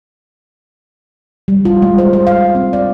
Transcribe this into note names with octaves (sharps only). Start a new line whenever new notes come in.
G3
F4
G#3
C5
C5
F5
C4
D5